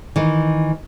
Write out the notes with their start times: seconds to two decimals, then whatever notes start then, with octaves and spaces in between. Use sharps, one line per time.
0.16 D#3 E3